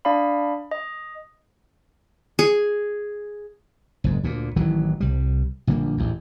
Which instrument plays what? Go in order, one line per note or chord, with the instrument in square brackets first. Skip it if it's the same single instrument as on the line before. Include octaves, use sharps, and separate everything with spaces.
[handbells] D4 D5 F5 B5
D#5
[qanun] G#4
[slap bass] F#1 G#2
D2 A#2
A1 D#3 E3 F#3
C2 G3
A#1 D3 G3 A#3
A1 E2